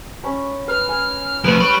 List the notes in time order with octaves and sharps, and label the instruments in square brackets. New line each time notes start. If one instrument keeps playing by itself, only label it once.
[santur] C#4 B5
[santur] B4 [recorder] F6
[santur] G#5
[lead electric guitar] F3 A3 [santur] B4 D#6
[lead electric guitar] G3 B5 [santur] C#5